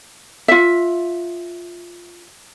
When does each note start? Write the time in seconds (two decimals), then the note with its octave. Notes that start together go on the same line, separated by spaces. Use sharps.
0.48 F4 E5